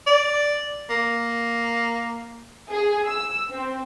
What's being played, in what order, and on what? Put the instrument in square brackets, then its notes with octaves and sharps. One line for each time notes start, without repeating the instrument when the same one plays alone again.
[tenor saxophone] D5
A#3
[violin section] G#4
E6
C4